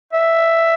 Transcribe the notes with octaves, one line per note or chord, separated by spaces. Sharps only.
E5